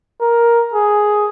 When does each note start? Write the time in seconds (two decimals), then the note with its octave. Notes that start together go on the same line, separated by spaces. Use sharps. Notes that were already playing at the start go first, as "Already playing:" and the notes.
0.21 A#4
0.74 G#4